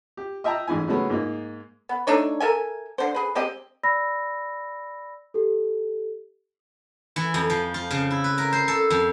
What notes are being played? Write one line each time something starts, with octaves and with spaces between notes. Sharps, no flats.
G4
D#5 E5 G5 A5 A#5
A1 G#2 E4 G#5
C#3 F#3 G#3 A3 B3 C#4
G#2 A#3 D#4
B3
A3 D4 D#4 C#5
A4 A#4 E5 G#5
D3 C5
G#4 B4
G#3 C4 G4 D#5
D5 B5 E6 A#6
G4 A4
E3
F2
F3
F4
C#3
E4
B4
A#4
C5
A4
F2